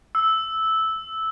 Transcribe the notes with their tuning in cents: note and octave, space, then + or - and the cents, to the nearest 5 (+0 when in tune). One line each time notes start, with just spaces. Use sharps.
E6 -10